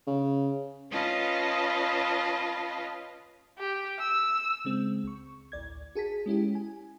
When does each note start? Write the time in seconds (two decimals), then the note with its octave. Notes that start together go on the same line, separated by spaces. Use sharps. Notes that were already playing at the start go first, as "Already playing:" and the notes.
0.07 C#3
0.91 C#4 F4 B4 D#5 F5 A5
3.59 G4
3.99 E6
4.65 C#3 G#3 C4
5.04 C#2 C#6
5.52 A1 D2 D5 G#6
5.95 F#4 G#4 A5 B6
6.26 G#3 C#4 E4 G4
6.55 G#5